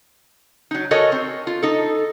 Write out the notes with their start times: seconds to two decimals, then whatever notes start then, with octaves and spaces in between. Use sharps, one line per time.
0.71 F#3 D#4
0.91 F#4 A4 A#4 C#5 D#5 G#5
1.12 C4
1.47 F4
1.63 D#4 A4